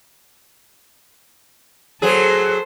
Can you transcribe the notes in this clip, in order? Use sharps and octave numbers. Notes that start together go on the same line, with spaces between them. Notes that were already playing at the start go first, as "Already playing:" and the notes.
F#3 G#4 A4 C5